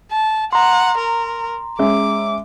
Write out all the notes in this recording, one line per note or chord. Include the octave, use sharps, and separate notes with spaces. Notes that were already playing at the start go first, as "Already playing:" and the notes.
A5
F#5 A#5 C6
A#4
G#3 C#4 E5 D6